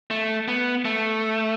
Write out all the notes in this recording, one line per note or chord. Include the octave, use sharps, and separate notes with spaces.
A3
B3
A3